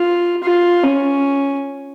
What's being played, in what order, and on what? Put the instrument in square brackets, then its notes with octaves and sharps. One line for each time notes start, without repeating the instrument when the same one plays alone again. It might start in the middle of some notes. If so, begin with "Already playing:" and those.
Already playing: [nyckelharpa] F4
F4
C#4